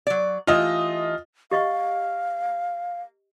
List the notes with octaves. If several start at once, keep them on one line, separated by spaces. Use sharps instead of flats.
F#3 D5
E3 A3 F4 G4 D#5
G4 D#5 F5 C#6